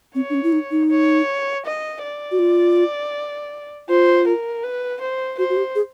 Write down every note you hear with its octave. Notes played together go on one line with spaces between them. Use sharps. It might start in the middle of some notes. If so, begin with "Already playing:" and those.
C4 C#5
D4
C#4
E4
D#4
D#4
C#5
D#5
D5
F#4
F4
F4 C5
A#4
B4
C5
F#4 C5
F#4
G4
G#4